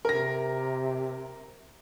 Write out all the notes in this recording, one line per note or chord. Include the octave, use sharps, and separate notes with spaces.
C3 A#4 A#6